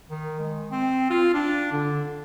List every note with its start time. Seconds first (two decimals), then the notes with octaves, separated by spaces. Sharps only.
0.10 D#3
0.39 G#3
0.71 C4
1.10 F4
1.34 D4
1.72 D3